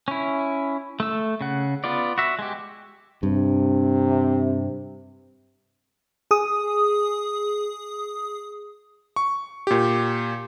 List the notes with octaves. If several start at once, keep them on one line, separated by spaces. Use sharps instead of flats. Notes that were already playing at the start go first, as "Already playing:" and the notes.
C#4 E4
A3 E6
C#3 F#5
B3 F4 D5
F#4 E5
G#3 G4
G2 C3
G#4 D#6
C#6
A#2 G4